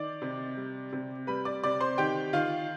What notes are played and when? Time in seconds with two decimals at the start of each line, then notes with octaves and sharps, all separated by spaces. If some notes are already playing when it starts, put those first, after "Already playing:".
Already playing: D#3 D5 D6
0.22 C3
0.57 G3
0.93 C3
1.27 G3 B4 B5
1.45 D5 D6
1.63 C3 D5 D6
1.81 C5 C6
1.98 D#3 G4 G5
2.33 D#3 F4 F5